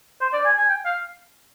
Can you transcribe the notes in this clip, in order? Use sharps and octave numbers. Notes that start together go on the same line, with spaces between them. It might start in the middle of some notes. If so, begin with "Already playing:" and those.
C5
D5
G#5
G#5
G5
F5